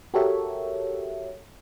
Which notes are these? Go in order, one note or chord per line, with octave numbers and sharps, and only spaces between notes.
F#4 G4 A4 A#4 C#5 E5